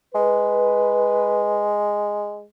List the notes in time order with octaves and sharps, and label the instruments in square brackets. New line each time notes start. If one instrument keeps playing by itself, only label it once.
[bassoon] G#3 [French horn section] B4